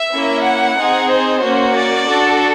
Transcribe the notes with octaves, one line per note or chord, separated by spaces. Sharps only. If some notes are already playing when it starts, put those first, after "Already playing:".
Already playing: E5
A#3 C#4 E4
F#5
C4 D#4 G#4
C5
A#3 C#4 F#4
D5
D4 F#4 A4